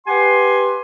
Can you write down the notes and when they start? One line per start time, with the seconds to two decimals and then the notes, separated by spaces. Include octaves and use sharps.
0.07 G4 B4 F#5 G#5 C6